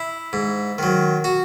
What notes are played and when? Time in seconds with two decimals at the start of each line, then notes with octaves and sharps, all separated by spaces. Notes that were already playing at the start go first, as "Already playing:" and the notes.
Already playing: E4
0.33 G#2
0.78 D#3 F#3
1.24 F#4